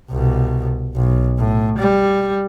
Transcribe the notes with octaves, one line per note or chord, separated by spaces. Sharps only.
C2 B2
B1
A2
G3